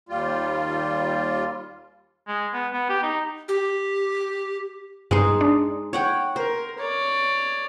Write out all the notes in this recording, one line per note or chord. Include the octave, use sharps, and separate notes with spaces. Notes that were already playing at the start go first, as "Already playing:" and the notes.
D#2 G3 F4
G#3
B3
B3
G4
D#4
G4
G2 G#3 B3 D#4 C5 C7
D4
C#5 F#5 G5
A#4 C5
C#5 D5